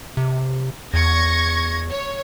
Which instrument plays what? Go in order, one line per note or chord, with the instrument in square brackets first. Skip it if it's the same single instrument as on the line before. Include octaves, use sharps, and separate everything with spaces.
[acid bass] C3
[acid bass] E2 [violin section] C#6 G#6 A#6
[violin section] C#5